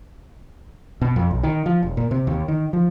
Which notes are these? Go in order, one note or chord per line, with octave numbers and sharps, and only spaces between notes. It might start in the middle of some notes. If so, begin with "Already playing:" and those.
B2
F2
B1
D#3
F3
E1
A#2
C3
D#2
D#3
F3